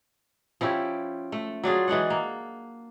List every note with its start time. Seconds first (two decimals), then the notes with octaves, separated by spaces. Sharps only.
0.61 F3 C#4 E4 G4
1.32 A3
1.64 F#3 D4 F4 G#4
1.88 E3 G#3 D4 F#5
2.10 A#3